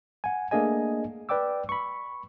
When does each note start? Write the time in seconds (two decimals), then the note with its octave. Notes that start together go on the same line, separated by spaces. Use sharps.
0.24 F#5 G#5
0.51 A3 A#3 D4 G#4 D#5 G#5
1.29 B4 D5 G5 D6 E6
1.69 B5 C#6